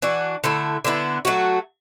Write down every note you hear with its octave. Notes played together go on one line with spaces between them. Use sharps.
E3 D4 F#4
D3 A3 E4 A4
D3 B3 E4
F#3 A3 F#4